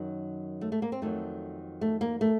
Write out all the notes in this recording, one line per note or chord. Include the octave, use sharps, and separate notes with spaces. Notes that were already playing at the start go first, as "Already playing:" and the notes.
Already playing: F#2 D#3 F#3
A3
A3
A#3
C4
F2 D#3 F#3 A3
A3
A#3
A3